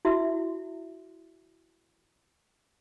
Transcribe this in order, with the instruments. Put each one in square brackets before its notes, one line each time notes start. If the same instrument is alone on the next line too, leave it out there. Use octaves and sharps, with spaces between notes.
[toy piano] E4 F#4 E5